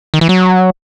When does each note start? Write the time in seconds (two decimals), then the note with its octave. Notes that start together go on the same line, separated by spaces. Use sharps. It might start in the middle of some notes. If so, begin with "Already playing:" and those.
0.14 D#3
0.21 E3
0.29 F#3